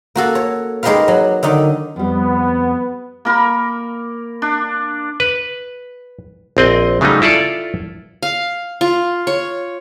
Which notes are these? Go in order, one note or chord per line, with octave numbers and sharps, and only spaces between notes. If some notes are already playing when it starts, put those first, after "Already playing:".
A#3 F#4 A4
C#5
G#3 D#4 G4 A#4 B4 F5
F#3
D3 D#3 D#4
F2 G3 B3
A#3 A#4 B5
D4
B4
A#1 C4 D#5
C#3 F#3 G3 A3 D#4
E4 F4 A4 D5 F5
F5
F4
C#5